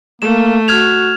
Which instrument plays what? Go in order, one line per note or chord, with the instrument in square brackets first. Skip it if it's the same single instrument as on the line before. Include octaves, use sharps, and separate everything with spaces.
[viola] A3 [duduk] A#3 [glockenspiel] E7
[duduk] F#4 [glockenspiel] F6 G#6 F7